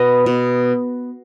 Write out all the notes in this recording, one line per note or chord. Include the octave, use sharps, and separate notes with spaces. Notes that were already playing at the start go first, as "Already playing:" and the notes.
Already playing: B2 B3 D#5
B2